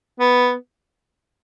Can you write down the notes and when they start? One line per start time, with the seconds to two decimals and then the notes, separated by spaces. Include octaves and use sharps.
0.19 B3